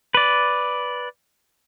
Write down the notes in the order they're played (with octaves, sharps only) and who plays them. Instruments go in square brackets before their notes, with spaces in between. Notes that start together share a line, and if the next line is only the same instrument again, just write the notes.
[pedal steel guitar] B4 D5